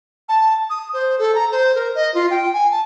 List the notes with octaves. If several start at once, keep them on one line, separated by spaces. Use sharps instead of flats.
A5
D#6
C5
A4
A#5
C5
A#4
D#5
F4
G5
G#5
A5